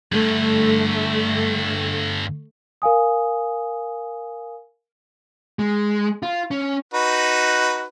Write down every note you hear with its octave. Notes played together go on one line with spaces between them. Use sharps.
G2 D3 A3
A#4 F5 G#5 D#6
G#3
F4
C#4
D#4 F#4 B4